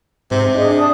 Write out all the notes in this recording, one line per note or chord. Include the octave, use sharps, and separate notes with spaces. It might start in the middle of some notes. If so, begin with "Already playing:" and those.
G#2 C3
D4 G#4 D#5
D5 A5 D#6